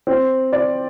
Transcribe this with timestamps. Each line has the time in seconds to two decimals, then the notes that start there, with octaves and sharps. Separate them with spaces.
0.07 C4
0.53 D5